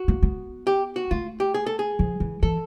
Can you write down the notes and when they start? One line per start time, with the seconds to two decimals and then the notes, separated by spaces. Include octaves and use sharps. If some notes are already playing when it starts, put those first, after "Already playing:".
Already playing: F#4
0.08 A#3
0.23 B3
0.67 G4
0.96 F#4
1.11 A3 F4
1.40 G4
1.54 G#4
1.66 A4
1.79 G#4
1.99 F3
2.20 E3
2.43 E3 A4